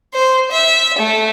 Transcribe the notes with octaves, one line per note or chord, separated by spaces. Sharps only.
C5
E5
A3